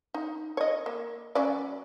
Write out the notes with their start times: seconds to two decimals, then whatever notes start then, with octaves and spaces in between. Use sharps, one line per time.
0.14 D#4
0.57 C#5 D#5
0.86 A#3
1.35 F#3 C#4 D5